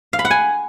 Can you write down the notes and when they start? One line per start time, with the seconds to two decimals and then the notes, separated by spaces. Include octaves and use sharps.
0.13 F5
0.19 B5
0.25 F#5
0.31 G#5